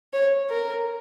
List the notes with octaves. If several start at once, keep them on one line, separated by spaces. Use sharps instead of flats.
C#5
A#4